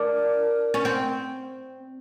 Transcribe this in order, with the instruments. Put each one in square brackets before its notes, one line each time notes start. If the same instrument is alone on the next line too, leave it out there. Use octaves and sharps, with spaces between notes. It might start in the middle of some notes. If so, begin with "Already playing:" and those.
Already playing: [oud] D4 [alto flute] A#4
[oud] C#4
C4